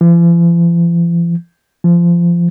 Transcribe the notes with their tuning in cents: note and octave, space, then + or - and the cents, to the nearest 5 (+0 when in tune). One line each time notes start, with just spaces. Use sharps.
F3 -45
F3 -20